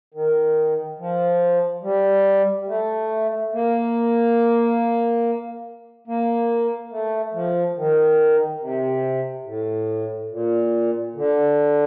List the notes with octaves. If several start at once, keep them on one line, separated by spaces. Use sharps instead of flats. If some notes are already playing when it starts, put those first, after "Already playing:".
D#3
F3
G3
A3
A#3
A#3
A3
F3
D#3
C3
A2
A#2
D3